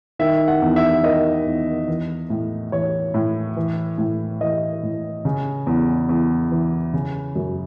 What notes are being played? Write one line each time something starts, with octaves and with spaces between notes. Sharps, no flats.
D#3 E5
F#5
E2
E5
D#3 D#5
E2
E3
A2
E3 C#5
A2
E3
A2
E3 D#5
A2
C#3
E2
E2
E3
C#3
F#2